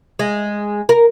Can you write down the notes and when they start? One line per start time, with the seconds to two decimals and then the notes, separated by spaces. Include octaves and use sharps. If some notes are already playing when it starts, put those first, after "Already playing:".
0.19 G#3
0.89 A#4